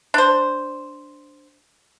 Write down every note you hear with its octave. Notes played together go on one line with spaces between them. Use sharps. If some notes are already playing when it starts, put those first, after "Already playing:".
D4 C5